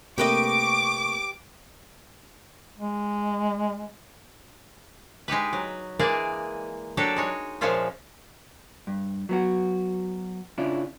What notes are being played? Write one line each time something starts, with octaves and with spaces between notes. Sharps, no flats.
C3 A3 A#3 G4 B4 D#5 C#6 D6
G#3
G#3 D#4 G4 B4
F#3
E3 G#3 A#3 G#4 D5
F#3 D4 F#4 G4 A4
G#3 D#4 C#5
A#2 F3 G#3 C#4 F4 E5
G2
F#3 B3 F#4
C#3 C#4 D4 E4 F4